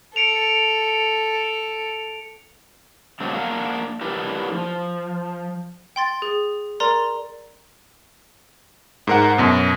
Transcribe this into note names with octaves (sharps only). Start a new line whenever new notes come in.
A4 C#7 D7 F7
B2 D3 F#3 G#3 C4 D4
A#3 D4 A#4 F5 F#5
D4 E4 G4 A#4 B4 D5
F3
G5 C6 A6
G#4
A#4 D5 A#5 C6 G7
G#2 A#4 F#5
F#2 B2